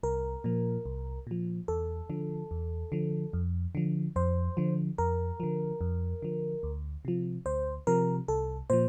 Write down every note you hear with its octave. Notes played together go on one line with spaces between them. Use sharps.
C2 A#4
A#2 F3
C2
A#2 F3
E2 A4
D3 F3
E2
D3 F3
F2
D3 F3
F2 C5
D3 F3
F2 A#4
D3 F3
F2
D3 F3
D2
C3 F3
D2 C5
C3 F3 A#4
C2 A4
A#2 F3 C5